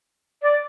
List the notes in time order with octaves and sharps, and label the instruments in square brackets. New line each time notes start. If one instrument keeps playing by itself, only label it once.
[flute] D5